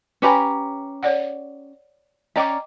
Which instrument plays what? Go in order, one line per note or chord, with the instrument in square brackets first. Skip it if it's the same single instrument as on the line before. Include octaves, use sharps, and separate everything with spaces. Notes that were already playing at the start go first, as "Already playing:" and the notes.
[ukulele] C#4 G4 A#5 [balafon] B4 G#5 B5
[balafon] C#5 D5 F#5
[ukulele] C#4 D5 A#5 [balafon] D#5 G5 D6